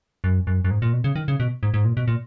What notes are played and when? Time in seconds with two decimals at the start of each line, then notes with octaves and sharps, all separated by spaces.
0.24 F#2
0.47 F#2
0.65 F#2
0.71 G#2
0.82 A#2
0.93 B2
1.04 C#3
1.16 D#3
1.28 C#3
1.40 B2
1.63 G#2
1.74 G#2
1.85 A#2
1.97 B2
2.08 A#2